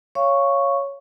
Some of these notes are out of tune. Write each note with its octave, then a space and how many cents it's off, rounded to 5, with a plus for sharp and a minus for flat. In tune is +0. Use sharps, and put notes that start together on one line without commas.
C#5 +0 F5 -15 C#6 +0